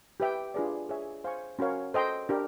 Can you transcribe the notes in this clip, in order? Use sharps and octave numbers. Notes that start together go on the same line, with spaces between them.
G4 B4 E5 G5
D4 F4 G#4 B4 D5
G#4 C#5 E5 G#5
C5 F5 G#5 C#6
C#4 F#4 A#4 C#5 F5
A4 C5 D#5 G5 C6
D4 G4 A#4